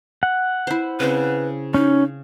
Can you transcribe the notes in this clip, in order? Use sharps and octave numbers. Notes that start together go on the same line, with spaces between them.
F#5
E4 C5
C#3 C4 B4
C#4 D#4